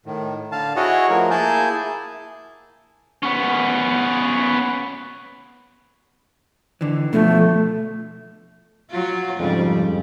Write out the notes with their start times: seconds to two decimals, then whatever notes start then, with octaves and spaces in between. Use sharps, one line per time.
0.06 A2 D#3
0.52 D3 F5 A5
0.76 E4 F#4 G#4 C#5 D#5 F#5
1.10 F3 A3 A#4
1.31 A#3 E4 G#4 G#5 A5 G6
3.23 B3 C#4
6.81 D3 E3
7.13 B2 F3 A3
8.90 F#3 F4
9.40 F2 G#2 C#3 G3